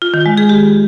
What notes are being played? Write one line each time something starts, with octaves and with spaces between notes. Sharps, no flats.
F4
D#3
G#3
G#4
G4